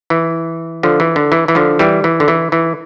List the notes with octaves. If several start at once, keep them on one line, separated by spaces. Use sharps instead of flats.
E3
D3 F3
E3
D3
E3
E3
D3 F3
E3 G3
E3
D3
E3
E3